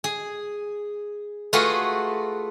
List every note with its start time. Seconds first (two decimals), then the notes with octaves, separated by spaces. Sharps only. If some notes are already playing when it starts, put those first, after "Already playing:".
0.04 G#4
1.53 A3 F4 F#4 G#4 B4